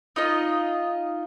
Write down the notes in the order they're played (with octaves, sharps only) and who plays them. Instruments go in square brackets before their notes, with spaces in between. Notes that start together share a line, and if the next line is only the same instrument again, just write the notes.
[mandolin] D#4 F4 D#5